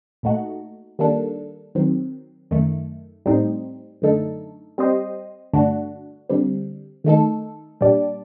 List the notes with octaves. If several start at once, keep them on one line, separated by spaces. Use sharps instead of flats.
A#2 A3 D#4 F#4
D#3 G3 A#3 D4 A4
D#3 F#3 C4
F#2 D#3 A3
A2 G3 C4 D#4
F#2 D3 A3 D#4 A4
G3 C4 G4 C5 D#5
G2 D3 A3 D4 F#4
D3 G3 C4
D#3 A3 D#4 A4
A#2 G3 D4 G4 D5